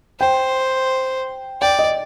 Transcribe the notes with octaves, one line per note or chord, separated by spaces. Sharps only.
C5 G5
D5 G5
D#5